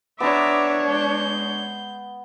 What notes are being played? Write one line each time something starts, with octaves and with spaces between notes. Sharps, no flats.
B3 D4 C#5 E5 A#5 D6
G#3 G6